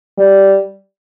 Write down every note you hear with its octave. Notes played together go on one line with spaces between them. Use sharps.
G3